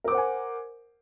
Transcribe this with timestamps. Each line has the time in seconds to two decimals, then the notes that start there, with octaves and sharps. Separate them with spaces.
0.04 A#4
0.08 D6
0.11 C5
0.14 F#5
0.18 G#5